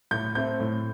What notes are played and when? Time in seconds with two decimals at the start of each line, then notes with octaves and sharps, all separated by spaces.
0.11 A2 G6
0.35 A3 C4 G6
0.60 A2